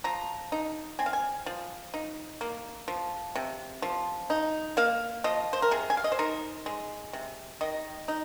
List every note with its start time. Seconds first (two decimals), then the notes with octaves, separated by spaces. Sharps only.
0.04 F3 A#5
0.52 D#4
0.99 C4 G#5
1.06 F5
1.13 G#5
1.46 F3
1.94 D#4
2.41 A#3
2.88 F3
3.35 C3
3.82 F3
4.30 D#4
4.77 A#3 F5
5.24 F3 D#5
5.53 C5
5.62 A#4
5.71 C3 G#4
5.90 G#5
5.97 F5
6.04 D#5
6.12 C5
6.19 D#4 A#4
6.66 G#3
7.13 C3
7.61 D#3 D#5
8.08 D#4